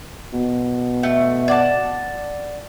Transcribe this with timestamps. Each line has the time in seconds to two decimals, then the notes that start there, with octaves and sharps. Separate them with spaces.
0.33 B2
1.03 A3
1.48 D5 F#5 A5